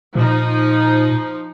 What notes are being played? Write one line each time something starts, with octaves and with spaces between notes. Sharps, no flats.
A#2 F3 D#4